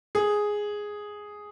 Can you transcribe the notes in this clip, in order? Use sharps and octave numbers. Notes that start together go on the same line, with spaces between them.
G#4